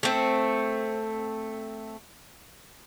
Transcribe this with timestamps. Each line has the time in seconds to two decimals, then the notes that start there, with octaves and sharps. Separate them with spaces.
0.03 A3 C4